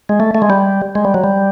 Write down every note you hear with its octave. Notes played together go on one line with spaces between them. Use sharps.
G#3
A3
A3
G#3
G3
G#3
G3
F#3
G3